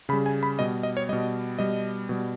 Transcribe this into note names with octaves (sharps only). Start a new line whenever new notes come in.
C#3 G3 B5
G#5
B5
B2 G3 D#5
D#5
C#5
B2 G3 D#5
B2 G3 D#5
B2 G3